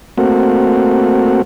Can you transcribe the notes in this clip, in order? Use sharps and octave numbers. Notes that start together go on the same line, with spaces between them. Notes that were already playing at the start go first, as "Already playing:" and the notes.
A3 A#3 C4 F#4